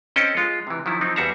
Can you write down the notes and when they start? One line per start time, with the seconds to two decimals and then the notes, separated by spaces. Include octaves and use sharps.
0.16 C4 C#4 A4 D#5 G5
0.37 G#3 F4
0.67 C3 E3
0.86 D#3 F3 F#3 E4
1.01 F3 F#3 C4 D#4
1.16 E2 G3 F#4 E5 F5 A#5